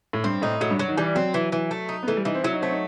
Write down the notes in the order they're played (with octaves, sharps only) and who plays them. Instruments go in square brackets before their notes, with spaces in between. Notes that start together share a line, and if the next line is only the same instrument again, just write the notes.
[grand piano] A2
[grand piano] G2 [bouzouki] C4
[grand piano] A2 [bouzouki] D#4
[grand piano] A2 [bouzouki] F#3
[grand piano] G2
[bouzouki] F#3
[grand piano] D#3
[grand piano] E3 [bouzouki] G3
[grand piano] F#3 [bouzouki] C4
[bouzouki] E3
E3
A3
D#4
[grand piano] B3
[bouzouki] E3 [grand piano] A3
[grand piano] G3
[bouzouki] E3 [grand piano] D#4
[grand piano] C4
[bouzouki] F#3 [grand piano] E4
[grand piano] D#4
[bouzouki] A3 [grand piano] C4
[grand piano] D#4